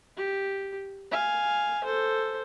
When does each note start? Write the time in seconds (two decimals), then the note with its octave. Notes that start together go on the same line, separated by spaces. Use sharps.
0.17 G4
1.11 F5 G#5
1.84 A4 C5